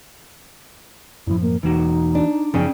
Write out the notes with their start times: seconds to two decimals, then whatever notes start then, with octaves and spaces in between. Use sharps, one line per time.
1.27 F#2 A2 F3 E4
1.42 A#3
1.63 E1 E3 A#3 D#4 F#4
2.15 D4
2.54 F#2 C#3 F3 B3 C#4 G#4 G5